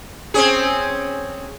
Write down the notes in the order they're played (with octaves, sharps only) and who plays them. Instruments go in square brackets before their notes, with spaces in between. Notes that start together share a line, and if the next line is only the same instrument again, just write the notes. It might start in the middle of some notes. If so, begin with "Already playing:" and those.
[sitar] C4 C#4 G#4